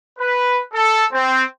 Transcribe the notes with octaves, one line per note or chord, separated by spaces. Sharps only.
B4
A4
C4